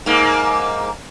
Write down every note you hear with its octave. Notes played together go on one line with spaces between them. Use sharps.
G#2 A#3